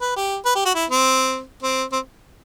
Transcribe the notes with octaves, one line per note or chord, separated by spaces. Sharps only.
B4
G4
B4
G4
F#4
E4
C4
C4
C4